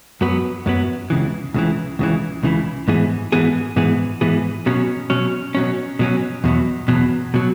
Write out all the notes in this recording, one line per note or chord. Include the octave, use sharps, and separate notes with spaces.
F#2 F#3 B3
F#2 F#3 B3
C#2 C#3 E3
C#2 C#3 E3
C#2 C#3 E3
C#2 C#3 E3
G#2 E3 B3 G#4
G#2 E3 B3 G#4
G#2 E3 B3 G#4
G#2 E3 B3 G#4
B2 F#3 C#4
B2 F#3 C#4
B2 F#3 C#4
B2 F#3 C#4
E2 B2 F#3
E2 B2 F#3
B2 F#3